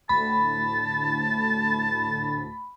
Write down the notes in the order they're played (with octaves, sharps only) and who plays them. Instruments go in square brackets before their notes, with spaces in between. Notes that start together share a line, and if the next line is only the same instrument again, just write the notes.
[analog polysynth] D2 A2 [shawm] A5 [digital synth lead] B5